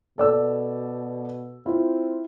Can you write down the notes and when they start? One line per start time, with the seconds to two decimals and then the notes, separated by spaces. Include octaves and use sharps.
0.18 B2 A4 D5 E6
1.66 C4 E4 F4